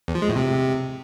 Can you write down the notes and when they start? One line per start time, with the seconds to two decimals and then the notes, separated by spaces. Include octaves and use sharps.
0.08 E2
0.15 F3
0.22 G#3
0.29 A2
0.36 C3